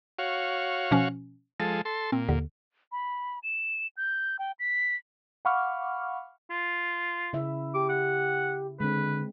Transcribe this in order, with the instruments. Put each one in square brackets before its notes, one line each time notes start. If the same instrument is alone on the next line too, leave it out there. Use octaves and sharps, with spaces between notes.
[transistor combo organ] F#4 C#5 F5
[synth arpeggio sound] B2 F3 C#4
[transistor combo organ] F3 G#3 A4 [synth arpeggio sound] A6
[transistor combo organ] A4 C6
[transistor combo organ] A#2 [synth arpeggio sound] C4
[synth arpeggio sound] D#2 D3
[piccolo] B5
E7
G6
G5
B6
[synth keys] F5 F#5 B5 C#6 D6 F6
[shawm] F4
[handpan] C#3 E4 E5
[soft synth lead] G4 [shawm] D6
[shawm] F#5
[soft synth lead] D3 [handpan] G#3 C4 [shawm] B4